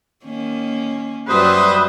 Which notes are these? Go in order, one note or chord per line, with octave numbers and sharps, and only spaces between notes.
D#3 A#3 C#4
F#2 F#3 G3 B4 C5 E5 D#6